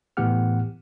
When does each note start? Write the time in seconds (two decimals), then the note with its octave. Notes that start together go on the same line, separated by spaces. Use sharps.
0.17 A2 E3 B3 G4 F#5 F6